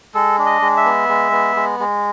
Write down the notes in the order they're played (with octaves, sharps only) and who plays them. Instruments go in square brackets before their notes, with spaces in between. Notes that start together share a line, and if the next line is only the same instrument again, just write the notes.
[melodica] G#3 A4
D4
D#5
G#3
E5
B3
G#3
B3
G#3
G#3